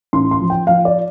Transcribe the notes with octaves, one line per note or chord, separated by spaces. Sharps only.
A1 C6
C6
F3
G5
F3 F5
D5